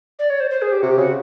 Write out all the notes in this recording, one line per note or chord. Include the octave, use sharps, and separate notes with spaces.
D5
C#5
C5
C5
G#4
G4
C3 F#4
G4
C#3 F#4